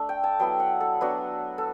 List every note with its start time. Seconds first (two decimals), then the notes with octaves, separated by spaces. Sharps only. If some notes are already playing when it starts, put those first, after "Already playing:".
Already playing: A3 D4 E5
0.09 G5
0.24 A5
0.39 F#3 B3 E4 G5
0.60 F#5
0.80 A4
1.01 F#3 B3 D4 F#4
1.58 A4